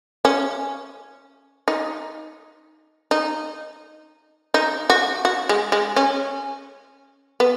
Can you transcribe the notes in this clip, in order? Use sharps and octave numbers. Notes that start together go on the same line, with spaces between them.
C#4
D#4
D#4
D#4
F#4
F#4
G#3
G#3
C#4
B3